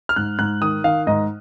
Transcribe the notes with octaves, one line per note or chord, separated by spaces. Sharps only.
F6
G#2 F#6
G#2 F#6
D#3 D#6
D#3 F5
G#2 D#5